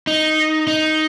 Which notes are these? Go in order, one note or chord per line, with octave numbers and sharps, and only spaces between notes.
D#4
D#4